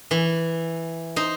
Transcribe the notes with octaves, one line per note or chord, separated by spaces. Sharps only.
E3
D#4 C5